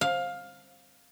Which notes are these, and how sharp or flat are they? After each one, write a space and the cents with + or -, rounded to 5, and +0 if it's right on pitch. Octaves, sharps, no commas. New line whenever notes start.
F5 +15